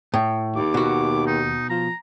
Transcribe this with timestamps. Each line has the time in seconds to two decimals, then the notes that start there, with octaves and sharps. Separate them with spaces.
0.14 A2
0.56 D#2 D6
0.74 B2 F#4
1.27 D#4
1.70 F3 A#5